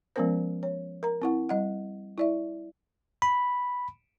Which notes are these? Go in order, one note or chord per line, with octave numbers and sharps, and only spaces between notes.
F3 G#3 B3 C#4 A#4 C5
C#5
A#4 A#5
C4 E4 F#5
G3 D#5 F#5
E4 D5 E5
B5